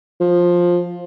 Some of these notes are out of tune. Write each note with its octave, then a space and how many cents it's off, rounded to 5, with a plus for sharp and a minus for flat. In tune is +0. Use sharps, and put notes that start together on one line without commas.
F3 +10